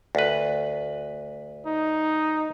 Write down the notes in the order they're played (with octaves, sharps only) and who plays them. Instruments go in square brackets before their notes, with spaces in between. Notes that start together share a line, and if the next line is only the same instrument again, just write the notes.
[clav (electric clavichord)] D2 B4
[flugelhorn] D#4